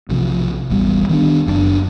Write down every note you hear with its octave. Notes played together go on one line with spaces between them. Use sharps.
B1 C3 F3
E1 A1 G3 B3
D#3 B3 C4 D4
F#1 F#2 C4 D4